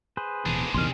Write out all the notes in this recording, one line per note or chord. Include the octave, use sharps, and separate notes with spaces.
G#4 B4 C5
D1 B2 E3 G#3 D4
A#1 E2 C3 D#3 C6 F6